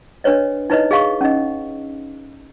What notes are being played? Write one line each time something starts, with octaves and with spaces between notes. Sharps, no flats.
D4 B4 C#5 D#5
D#4 E4 B4 C#5 D#5
G#4 D#5 F5 C#6
C#4 D#4 D#5